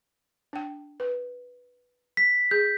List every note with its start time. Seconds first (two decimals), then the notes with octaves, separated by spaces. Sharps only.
0.53 D4 G5
1.00 B4
2.17 B6
2.51 G#4 G6